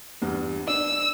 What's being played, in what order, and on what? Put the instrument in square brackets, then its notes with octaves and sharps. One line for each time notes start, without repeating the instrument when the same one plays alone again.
[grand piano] E2 G2
[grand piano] D4 [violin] E6